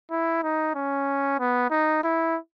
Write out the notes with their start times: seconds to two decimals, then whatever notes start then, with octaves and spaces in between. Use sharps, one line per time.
0.11 E4
0.43 D#4
0.75 C#4
1.40 B3
1.71 D#4
2.04 E4